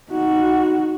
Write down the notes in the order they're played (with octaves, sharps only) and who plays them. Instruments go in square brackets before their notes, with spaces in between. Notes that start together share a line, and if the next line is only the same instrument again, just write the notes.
[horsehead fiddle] D#4 F#4